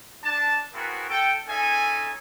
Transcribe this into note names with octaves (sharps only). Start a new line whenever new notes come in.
D4 A5
B3 C4 E4 F#4 G#4 A#4
A4 G5
C#4 D#4 G#4 A4 E5 G#5